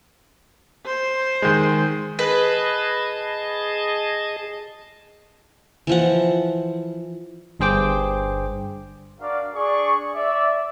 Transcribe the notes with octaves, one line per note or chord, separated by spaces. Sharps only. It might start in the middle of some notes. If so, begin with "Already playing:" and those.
C5
D#3 G#3
G#4 B4 D#5 A5
E3 F3 F#5
G1 G2 G#4 C5 G5 D6
D4 F#4 A#4 D5 F5
D4 G#4 D5 C#6
D5 E5